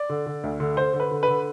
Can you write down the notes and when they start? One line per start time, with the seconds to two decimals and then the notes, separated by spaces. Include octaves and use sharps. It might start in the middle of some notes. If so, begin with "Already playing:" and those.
Already playing: D5
0.09 D3
0.26 D3
0.43 D2
0.60 D3
0.77 D3 C5
0.93 D3
1.00 B4
1.11 D3
1.23 B4
1.28 D3